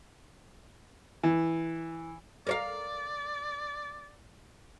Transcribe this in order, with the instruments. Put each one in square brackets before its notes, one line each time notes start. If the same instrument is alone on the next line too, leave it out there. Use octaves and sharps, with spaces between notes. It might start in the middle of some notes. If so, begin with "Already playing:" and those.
[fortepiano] E3
[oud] A#4 C#5 F5 [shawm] D5